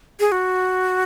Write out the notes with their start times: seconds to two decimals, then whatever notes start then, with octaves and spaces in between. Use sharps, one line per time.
0.20 G#4
0.32 F#4